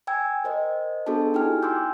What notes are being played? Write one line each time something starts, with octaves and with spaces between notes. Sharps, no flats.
G5 G#5 E6 G#6
A#4 C5 D#5
B3 D4 F#4 G#4 A4 A5
D#4 E4 G4 G5 G#5 F6
G5 G#5 C6 D6 E6 G6